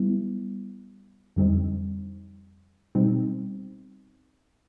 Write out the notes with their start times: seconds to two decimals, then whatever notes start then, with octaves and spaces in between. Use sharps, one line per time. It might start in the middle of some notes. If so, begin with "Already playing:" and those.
Already playing: G3 B3 E4
1.36 F2 D3 G3 C4 D#4
2.95 B2 G3 C4 D#4